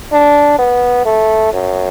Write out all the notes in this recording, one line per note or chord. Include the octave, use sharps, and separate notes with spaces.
D4
B3
A3
F#2